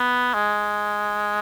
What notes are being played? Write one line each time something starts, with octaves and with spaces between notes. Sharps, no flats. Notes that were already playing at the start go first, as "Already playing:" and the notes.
Already playing: B3
G#3